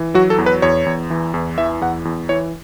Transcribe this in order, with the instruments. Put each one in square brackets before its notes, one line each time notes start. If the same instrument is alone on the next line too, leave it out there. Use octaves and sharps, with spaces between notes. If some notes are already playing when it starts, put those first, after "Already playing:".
Already playing: [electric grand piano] E3
F#3 F#4
A4
E2
B4
E2 C#5
E2
E3
E2
E3 E5
E2 F#5
E2
E3 C#5